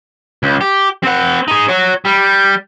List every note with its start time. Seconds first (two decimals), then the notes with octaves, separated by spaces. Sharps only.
0.43 C#2
0.61 G4
1.03 C4 F#5
1.48 D#4 G#4
1.68 F#4 C#5
2.05 G3